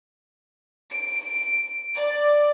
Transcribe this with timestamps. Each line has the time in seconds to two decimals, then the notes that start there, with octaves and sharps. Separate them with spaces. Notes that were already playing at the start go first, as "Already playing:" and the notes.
0.90 D7
1.96 D5